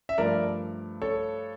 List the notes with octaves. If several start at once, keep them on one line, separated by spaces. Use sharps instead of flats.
E5
G2 F3 A3 A#4 D5
A4 C#5